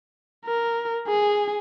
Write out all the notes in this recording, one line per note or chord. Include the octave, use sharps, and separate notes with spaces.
A#4
G#4